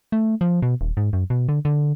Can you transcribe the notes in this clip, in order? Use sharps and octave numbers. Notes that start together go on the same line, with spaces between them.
A3
F3
B2
D#1
G#2
F#2
B2
D3
D3